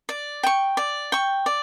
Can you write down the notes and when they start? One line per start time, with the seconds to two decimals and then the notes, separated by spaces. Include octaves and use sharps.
0.09 D5
0.43 G5 C#6
0.77 D5
1.12 G5 C#6
1.46 D5